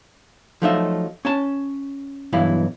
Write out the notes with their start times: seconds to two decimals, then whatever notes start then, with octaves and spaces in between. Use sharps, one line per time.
0.62 F3 F#3 A3 D#4 F4 E5
1.25 C#4 A5
2.33 B1 G2 E3 E4 F5